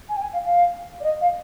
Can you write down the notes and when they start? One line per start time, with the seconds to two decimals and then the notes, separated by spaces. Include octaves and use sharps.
0.08 G#5
0.16 G5
0.21 G#5
0.32 F5
0.44 F5
1.00 D5
1.03 D#5
1.20 F5